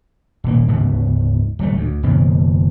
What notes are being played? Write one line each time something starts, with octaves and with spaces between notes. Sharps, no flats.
D#1 G#2 A#3
D1 G#2 C#3 B3
D1 G3 A3
D2
F#1 B2 D#3 A#3